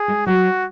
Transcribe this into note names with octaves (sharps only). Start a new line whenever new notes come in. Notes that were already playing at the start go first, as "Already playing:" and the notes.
Already playing: G#4
G#3
F#3 F#4